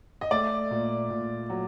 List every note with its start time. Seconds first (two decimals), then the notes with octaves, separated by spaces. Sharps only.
0.21 D#5
0.31 A3 D5
0.71 A#2
1.10 A#2
1.50 F#3